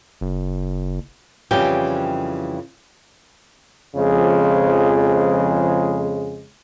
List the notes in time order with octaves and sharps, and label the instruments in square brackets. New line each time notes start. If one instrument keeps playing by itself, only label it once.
[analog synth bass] F#1
[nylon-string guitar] F2 C#3 E3 G3 G4 G5
[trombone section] F2 C#3 F3 G#3